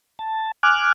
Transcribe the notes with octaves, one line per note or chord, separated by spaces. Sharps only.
A5
G#5 D6 F6 F#6